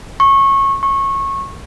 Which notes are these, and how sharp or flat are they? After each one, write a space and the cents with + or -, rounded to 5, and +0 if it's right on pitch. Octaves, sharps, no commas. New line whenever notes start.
C#6 -20
C#6 -20